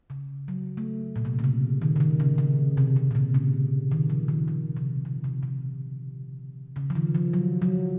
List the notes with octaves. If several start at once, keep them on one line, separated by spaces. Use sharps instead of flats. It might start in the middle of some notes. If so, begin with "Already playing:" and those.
C#3
F#3
A3
A#2
C3
C#3
C3
D#3
C#3
D#3
C#3
C#3
C3
C3
A#2
C3
C#3
D#3
F3
D#3
C#3
C3
C3
C3
C3
C#3
F3
D#3
F3
F#3
F#3